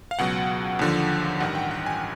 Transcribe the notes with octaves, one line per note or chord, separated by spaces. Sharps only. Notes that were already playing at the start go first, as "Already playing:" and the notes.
F5
C#2 B2 F#3 F#5
D#2 D3 F3
A1 G2 D#3 F#5
G5
F#5
G#5